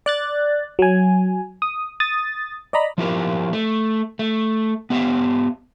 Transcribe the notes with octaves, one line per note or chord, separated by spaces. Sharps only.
D5 F#6 A6
F#3 G#5
D#6
D#6 A6
D5 D#5 A#5 B5
F3 E4 G4 A#4
A3
A3
B3 G4 B4 E5 F5